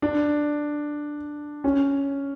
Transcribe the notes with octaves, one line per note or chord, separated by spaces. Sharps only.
D4
C#4